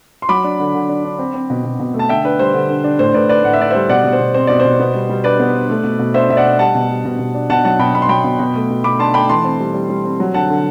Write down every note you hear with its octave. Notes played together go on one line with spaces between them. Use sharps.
C6
F#3 B5 D6
D4
D3
D3
D4
D4
C4
C4
B2
B2
B2
A3
A5
D3 E5 G5
D4 B4
G3 C5
D3
D3
D4
A2 C5
A2 B4 D5
D4 B4 D5
A2 F#5
E5
D4 D5
G3 C5 E5
B2 D5 F#5
B2
C5
B2
C4 C5
B2 D5
B2 C5
B3
G3
G3
D4 B4 D5
B3
D4
A3
B2
B2
D4 C5 E5
B2 E5
D5 F#5
D4
G3 F#5 A5
B2
G3
B2
B2
D4
B2 F#5 A5
F#3 F#5 A5
B2 G5 B5
B2 B5
C6
F#3 G5 B5
B2
B2
A3
B2
B2 B5 D6
D4 A5 C6
A3 G5 B5
E3 A5 C6
C4
G3
G3
G3
C4
F#3
D3 F#5 A5
D3